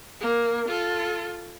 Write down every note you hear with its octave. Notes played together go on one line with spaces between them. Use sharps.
A#3
F4 A4